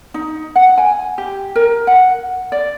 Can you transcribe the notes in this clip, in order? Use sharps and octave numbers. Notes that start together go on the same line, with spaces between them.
D#4
F#5
G#5
G4
A#4
F#5
D5